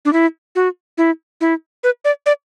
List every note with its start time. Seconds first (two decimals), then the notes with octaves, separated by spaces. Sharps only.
0.05 D4
0.13 E4
0.55 F#4
0.98 E4
1.41 E4
1.84 B4
2.05 D5
2.26 D5